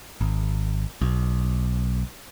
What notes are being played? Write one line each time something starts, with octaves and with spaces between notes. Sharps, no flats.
G#1
B1